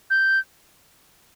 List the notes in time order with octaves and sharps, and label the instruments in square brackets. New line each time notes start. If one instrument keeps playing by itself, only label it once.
[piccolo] G6